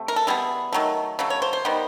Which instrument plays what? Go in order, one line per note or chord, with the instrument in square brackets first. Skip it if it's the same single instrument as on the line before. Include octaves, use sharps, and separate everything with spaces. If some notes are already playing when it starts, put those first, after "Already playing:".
Already playing: [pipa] C3 A3
A#4
A4
E3 G3 B3 G#4
D#3 F#3 A3
C#3 F#3 A3
C#5
C5
C5
D#3 G3 B3